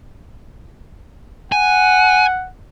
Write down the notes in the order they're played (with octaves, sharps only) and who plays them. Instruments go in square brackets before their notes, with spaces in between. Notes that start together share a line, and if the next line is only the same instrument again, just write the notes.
[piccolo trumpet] F#5 [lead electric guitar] G#5